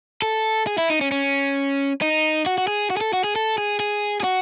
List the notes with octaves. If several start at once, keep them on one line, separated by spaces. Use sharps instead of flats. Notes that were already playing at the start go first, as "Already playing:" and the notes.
A4
G#4
E4
D#4
C#4
C#4
D#4
F#4
F#4
G#4
F#4
G#4
A4
F#4
G#4
A4
G#4
G#4
G#4
F#4